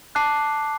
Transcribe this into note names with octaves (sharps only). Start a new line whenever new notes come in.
A5 D6 F#6 C7